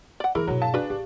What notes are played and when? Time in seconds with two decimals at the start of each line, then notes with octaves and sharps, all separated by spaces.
0.20 D5 F#5
0.35 E3 G3 E4 G#4 A#4
0.47 G2 B2 F#3
0.62 F5 A5
0.74 D4 F#4 G#4 B4
0.90 A1 G4